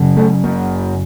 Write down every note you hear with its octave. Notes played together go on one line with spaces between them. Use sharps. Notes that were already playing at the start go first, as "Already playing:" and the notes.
Already playing: F#1 F#2 C#3
A3
A#3